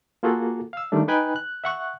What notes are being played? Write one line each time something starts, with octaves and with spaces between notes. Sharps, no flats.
A#3 F4 F#4 G#4 A4
F5 E6
D#3 G3 A3 D4
D#4 B4 G5 G#5 B5 F#6
F#6
E5 F#5 C#6 F#6